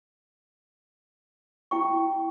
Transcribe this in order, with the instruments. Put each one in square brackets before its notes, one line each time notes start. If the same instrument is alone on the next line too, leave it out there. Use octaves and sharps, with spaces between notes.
[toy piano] E4 G5 C#6